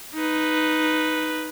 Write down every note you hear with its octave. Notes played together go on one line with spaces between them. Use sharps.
D#4 B4